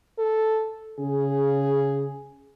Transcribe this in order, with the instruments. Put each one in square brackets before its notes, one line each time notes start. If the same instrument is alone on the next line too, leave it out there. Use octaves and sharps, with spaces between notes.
[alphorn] A4
[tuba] C#3 [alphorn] G#4